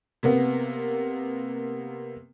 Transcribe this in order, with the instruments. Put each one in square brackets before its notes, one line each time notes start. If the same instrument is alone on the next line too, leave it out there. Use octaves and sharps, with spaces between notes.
[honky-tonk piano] C3 A#3 B3